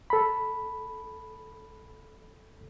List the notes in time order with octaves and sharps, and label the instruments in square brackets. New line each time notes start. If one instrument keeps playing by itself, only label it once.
[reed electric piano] A4 B5